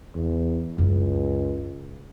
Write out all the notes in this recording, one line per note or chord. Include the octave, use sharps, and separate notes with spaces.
E2
C#2 F#2 E4